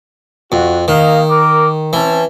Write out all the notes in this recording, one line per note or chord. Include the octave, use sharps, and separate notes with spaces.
F2 F#4
D#3 A#3 D#5 F5
A#4 D6
E3 C4 C#4 A5